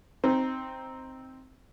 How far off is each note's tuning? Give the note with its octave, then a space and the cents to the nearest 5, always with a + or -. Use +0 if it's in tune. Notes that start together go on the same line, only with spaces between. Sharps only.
C4 +0 D#4 +0